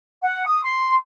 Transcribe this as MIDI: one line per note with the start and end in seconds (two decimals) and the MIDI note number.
0.22 0.45 78
0.46 0.63 87
0.64 0.93 84